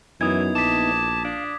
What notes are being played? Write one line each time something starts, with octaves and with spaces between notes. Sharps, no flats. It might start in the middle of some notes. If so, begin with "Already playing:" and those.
F#2 E3 B3 D#4 E4 D#6 G#6
A#1 A5 D6 B6
D4 F5